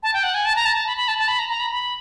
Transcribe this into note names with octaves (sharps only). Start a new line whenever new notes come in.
A5
G5
F#5
G#5
A5
A#5
A5
A5
B5
B5
A5
A5
B5
A#5
A#5
B5
B5